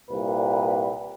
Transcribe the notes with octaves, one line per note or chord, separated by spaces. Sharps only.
C2 A#2 B4